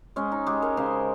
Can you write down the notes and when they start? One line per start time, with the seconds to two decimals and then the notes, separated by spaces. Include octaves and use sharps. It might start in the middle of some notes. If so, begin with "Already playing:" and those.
0.16 G#3 C#4
0.32 D#4
0.47 G#3 G4
0.62 A#4
0.77 C#3 C5